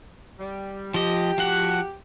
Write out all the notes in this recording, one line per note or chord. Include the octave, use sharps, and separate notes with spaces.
G3
F3 G4 D#5
F3 F#4 F#5